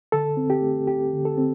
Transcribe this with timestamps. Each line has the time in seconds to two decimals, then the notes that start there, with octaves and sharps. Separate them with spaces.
0.12 D3 A4
0.37 C4
0.50 G4
0.62 A3
0.87 D2 G4
1.13 D3
1.25 A4
1.38 C4